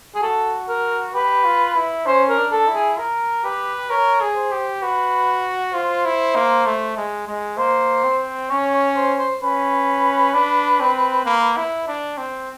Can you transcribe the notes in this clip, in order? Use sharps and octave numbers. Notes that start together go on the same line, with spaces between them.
G#4
F#4 A4
A#4
G4 B4
F4
E4
C#4 C5
A#4
D4
A4
E4
G#4
A#4
G4 B4
A#4 C#5
G#4
C5
G4
F#4 B4
F4 C5
E4
A#3
A3
G#3
G#3
A#3 C5
C4
C#4 C#5
C#5
C5
C5
C#4 B4
D4
C4
A#3
E4
D4
C4